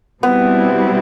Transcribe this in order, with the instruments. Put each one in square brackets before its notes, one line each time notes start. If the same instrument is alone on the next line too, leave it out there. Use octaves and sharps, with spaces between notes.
[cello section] B2 G3 C4 E4 [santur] B3